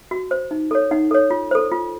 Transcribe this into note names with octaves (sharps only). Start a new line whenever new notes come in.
F#4
C5
D#4
A4 C#5
D#4 F#5
A4 C#5
F4
A4 C5
F4